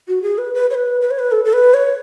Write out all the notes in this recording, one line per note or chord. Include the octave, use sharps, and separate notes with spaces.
F#4
G#4
B4
B4
C#5
B4
B4
C#5
B4
A4
A4
B4
C#5